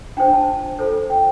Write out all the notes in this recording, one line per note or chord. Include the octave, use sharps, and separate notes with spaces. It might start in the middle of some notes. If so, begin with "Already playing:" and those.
D4 F4 C5 G5
A5
F4 A4 C5
G5